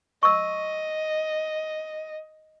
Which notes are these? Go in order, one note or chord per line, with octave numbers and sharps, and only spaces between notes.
D#5 C#6 E6